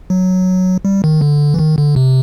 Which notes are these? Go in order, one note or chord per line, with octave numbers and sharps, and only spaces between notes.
F#3
G3
D#3
D3
E3
D#3
D3
C3